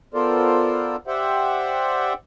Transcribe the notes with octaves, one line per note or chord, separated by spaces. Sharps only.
B3 F4 A4 A#4 C5 D5
G4 C5 D5 E5 F#5 G5